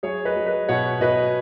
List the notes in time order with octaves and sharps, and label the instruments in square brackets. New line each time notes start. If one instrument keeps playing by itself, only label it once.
[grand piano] F#3 G#4 C#5
B4 D#5
F#3
B4 D#5
B2 C#5 F#5
B2 B4 D#5